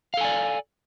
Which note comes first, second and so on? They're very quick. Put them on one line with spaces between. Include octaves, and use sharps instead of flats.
F5 A4 G#5 D5